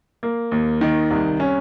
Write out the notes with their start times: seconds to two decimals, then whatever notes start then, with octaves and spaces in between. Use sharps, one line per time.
0.23 A#3
0.52 D#2
0.81 D#3
1.10 C2
1.40 C#4